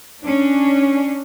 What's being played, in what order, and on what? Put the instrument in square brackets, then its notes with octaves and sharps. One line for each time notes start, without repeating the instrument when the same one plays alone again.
[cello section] C#4 D4